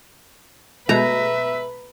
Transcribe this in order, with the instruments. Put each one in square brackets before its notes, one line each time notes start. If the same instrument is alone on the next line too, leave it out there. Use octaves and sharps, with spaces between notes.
[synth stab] B2 G#3 A3 [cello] B4 [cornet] E5 [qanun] A#5